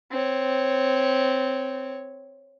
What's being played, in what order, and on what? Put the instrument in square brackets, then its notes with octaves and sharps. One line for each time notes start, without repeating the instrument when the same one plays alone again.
[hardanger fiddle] C4 C#5